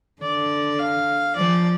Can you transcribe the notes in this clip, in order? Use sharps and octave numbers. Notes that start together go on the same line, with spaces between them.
D3 D5
F5
F3 D5